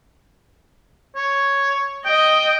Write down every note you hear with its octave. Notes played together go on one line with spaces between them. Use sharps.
C#5
D#5 G5